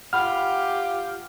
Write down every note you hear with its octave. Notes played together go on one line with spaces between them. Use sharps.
F4 G4 F#5 B5 F6